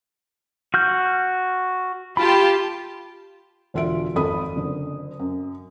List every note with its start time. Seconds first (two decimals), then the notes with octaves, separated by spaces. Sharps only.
0.74 F#4 F6 G6
2.17 F4 G4 A5 B5
3.74 E1 D3 F4 E5 D7
4.15 G#1 F2 A4 B5 D#6
4.56 F#1 D3
5.19 F#2